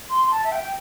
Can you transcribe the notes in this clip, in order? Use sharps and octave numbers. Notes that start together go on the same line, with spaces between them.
C6
A5
E5
G5